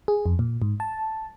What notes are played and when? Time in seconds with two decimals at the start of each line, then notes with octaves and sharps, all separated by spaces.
0.08 G#4
0.26 F2
0.39 A#2
0.62 G#2
0.80 A5